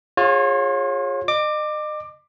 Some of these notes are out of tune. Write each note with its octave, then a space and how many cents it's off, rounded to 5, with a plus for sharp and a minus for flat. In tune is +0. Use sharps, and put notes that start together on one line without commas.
F4 +30 G#4 -10 C#5 -25
D#5 -35 D6 +15